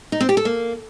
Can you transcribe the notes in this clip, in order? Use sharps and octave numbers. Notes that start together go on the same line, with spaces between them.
D#4
C4
G4
A4
A#3